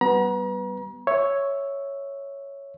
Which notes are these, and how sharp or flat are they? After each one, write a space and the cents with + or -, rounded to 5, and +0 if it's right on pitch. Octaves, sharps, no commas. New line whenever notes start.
G3 -25 B3 +0 A#5 +40
C#5 +0 E5 +0